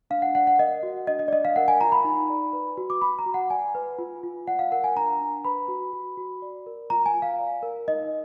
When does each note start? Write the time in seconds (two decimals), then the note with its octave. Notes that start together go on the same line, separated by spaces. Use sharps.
0.10 D4 F5
0.22 F#5
0.35 D5 F#5
0.47 F#5
0.59 A#4 D#5
0.83 F#4
1.07 D4 D#5
1.19 D#5
1.28 D5
1.32 D4 D#5
1.45 F5
1.56 A#4 F#5
1.68 G#5
1.81 F4 A#5
1.92 B5
2.04 D#4
2.30 D5
2.53 B4
2.78 F#4
2.90 D6
3.01 F#4 B5
3.19 A#5
3.26 F#4
3.34 F#5
3.50 D5 G#5
3.75 B4
3.98 F4
4.23 F4
4.47 D5 F#5
4.59 F5
4.72 A#4 F#5
4.84 G#5
4.96 D4 A#5
5.21 D4
5.45 B4 B5
5.68 F#4
5.93 F#4
6.17 F#4
6.42 D5
6.66 A#4
6.90 F4 A#5
7.06 G#5
7.14 F4
7.22 F5
7.39 D5
7.63 A#4
7.88 D#4 D#5